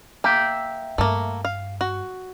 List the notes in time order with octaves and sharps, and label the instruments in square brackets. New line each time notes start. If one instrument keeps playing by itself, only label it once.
[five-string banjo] A#3 [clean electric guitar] E5 G5
[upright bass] G2 [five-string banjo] A3 A#3
[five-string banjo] F5
F#4